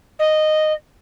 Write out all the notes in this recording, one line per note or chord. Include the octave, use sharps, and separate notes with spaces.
D#5